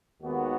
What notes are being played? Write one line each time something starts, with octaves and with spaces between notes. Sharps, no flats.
D#2 D#3 G#3 B3 F#4